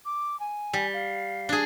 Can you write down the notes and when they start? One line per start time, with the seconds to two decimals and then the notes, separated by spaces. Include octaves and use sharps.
0.05 D6
0.40 G#5
0.73 G3
0.94 F5
1.49 D4 G#4